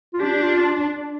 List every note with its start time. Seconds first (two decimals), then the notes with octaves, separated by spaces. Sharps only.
0.13 F4
0.20 D4 G4
0.42 F4